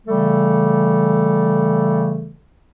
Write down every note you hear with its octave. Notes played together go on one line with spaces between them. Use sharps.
C#3 E3 G3 A3 A4